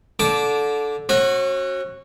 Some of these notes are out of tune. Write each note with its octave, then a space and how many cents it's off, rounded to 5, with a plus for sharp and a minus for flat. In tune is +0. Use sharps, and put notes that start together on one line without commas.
D3 -15 A5 -20 D6 +0
C#4 -40 F#4 +0